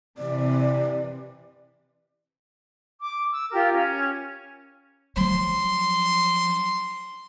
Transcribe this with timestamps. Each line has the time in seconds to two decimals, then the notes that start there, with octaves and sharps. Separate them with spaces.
0.18 C3 E3 D5
3.00 D6
3.31 E6
3.52 F4 G4 A#4
3.71 C#4
5.17 F3 F#3 C6